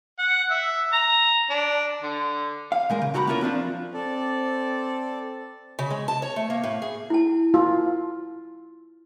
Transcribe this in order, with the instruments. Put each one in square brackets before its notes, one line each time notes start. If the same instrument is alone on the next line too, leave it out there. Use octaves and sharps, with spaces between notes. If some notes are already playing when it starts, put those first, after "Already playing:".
[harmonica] F#5
E5
A#5
D4
D3
[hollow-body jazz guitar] F5
A#2 G#3 A#4
C#3
C#2 F#4 G4 A#5 B5
A#3 C#4 E4 F4 A#4
F3 C4 D4 F4
[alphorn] C4 [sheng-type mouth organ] A4 D5
[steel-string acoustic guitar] C#3
G#3
A5
C#5
A3
A#3
A2
G#4
[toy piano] E4 A5
[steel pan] F4